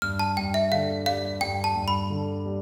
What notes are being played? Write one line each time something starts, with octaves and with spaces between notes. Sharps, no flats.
G2 F6
A5
G2 G5
E5
D3 F5
G3 F5
G2 G5
A5
G2
B5
D3
G3